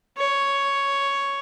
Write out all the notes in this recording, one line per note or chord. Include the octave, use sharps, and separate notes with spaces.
C#5